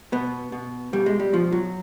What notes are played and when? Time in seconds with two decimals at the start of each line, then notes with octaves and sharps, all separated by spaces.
0.12 B2 B3
0.52 B2
0.93 B2 G3
1.06 G#3
1.20 G3
1.33 B2 F3
1.52 F#3